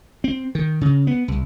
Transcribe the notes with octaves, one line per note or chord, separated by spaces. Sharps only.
C4
D#3
C#3
B3
C2